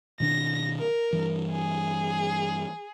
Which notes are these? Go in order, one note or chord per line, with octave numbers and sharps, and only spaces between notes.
B2 D#3 D4 A#6
A#4
G2 E3
G#4